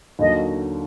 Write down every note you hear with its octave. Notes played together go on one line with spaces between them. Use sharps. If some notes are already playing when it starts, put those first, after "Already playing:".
D#2 D3 F#3 D#5